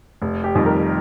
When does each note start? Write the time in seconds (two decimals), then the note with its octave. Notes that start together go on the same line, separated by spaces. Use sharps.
0.22 F1
0.44 G4
0.55 F2 D#3 G3
0.66 A#4